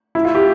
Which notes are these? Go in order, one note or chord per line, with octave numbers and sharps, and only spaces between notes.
E4
F4
G4